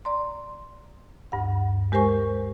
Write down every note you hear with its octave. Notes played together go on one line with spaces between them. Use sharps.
D5 A#5 C6
D2 G2 F#5
G#3 G4 A#4 C5 G#5 C#6